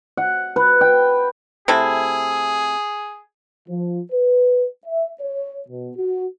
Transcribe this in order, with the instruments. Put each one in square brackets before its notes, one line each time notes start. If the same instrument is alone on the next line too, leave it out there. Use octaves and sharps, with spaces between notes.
[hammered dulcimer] F#5
B4
G5
[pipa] C3 A3 E4 [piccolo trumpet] G#4
[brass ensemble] F3
B4
E5
C#5
B2
F#4